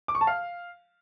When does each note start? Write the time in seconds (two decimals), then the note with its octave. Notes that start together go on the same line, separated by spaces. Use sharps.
0.08 D6
0.15 C#6
0.21 A5
0.27 F5